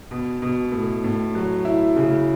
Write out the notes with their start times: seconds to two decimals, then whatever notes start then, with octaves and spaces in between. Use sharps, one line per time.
0.11 B2
0.42 B2
0.72 A2
1.04 A2
1.35 F#3
1.65 E4
1.96 C#3